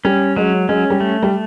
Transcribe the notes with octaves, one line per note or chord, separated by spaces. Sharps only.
G3 C#4
F#3 G#3
G#3 C#4
G3
A3
G3